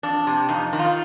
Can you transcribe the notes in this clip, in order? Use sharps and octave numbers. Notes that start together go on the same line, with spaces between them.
F2 D4
C3
F2 D#4
D#3
F4